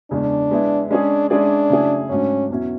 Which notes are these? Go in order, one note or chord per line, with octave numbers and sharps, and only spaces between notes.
E2 C#3 G#3 C#4 D4
G#3 B3 E4
G#3 C#4 D4 G#4
G#3 C#4 D4 E4 G#4 D5
C#3 F#3 A3 E4 G#4
G#2 F#3 A3 C#4 D4
E2 B2 F#3 C#4 E4